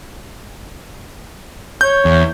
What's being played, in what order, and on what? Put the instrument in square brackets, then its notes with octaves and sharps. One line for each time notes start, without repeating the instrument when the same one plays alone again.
[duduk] C#5 [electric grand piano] G6
[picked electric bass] E2